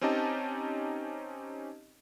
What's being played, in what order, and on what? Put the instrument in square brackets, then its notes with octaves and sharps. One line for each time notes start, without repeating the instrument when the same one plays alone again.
[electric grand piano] C4 C#4 D#4 G4 D#5 A5